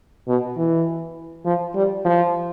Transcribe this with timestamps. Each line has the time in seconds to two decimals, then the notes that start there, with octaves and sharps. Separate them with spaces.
0.28 B2
0.57 E3
1.45 F3
1.75 G3
2.05 F3